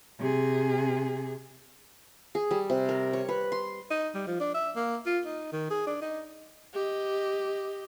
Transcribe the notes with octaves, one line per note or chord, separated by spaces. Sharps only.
C3 G#4
G#4
G3
C3
A#4
C#5
B4
C6
D#4
G3
F3
D4
E5
A#3
F4
D#4
D#3
G#4
D4
D#4
G4 D#5